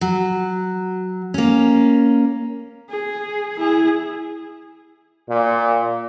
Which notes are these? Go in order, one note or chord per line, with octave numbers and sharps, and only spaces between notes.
F#3
A#3 C#4
G#4
E4 G#4
A#2